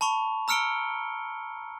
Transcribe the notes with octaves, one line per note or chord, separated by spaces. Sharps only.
A5 B5 C#6 F7
A#5 E6 F6 C#7 D7 G7